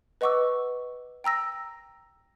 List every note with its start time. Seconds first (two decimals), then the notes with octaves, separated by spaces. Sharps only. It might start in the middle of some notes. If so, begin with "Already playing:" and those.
0.21 B4 D#5 F#5 C#6 D6 E6
1.24 G5 A#5 E6 A#6